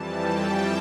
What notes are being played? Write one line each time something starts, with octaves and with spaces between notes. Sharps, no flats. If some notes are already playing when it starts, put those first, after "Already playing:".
Already playing: F2 E3 G3 A5
G5